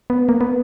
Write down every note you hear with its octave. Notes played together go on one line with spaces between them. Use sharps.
B3
A#3
B3